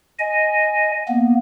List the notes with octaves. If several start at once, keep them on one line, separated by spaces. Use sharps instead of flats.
D#5 G#5
A#3 B3